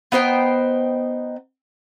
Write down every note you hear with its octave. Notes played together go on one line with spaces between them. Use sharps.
B3 D#4 C5 G5